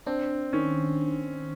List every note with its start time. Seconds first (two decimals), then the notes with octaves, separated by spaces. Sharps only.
0.07 C4 D4
0.53 D#3 C#4